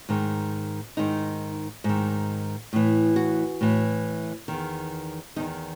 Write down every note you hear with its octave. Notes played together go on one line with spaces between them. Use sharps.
G#2 D#3
G#2 D#3 D#4
G#2 D#3
A2 E3
F#4
A2 E3
E2 D#3
E2 D#3 D#4